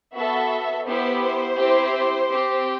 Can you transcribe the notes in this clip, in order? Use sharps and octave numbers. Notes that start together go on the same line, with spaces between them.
B3 F#4 A4 E5
B3 E4 G4 C5
C5
C4 E4 G4
C4 G4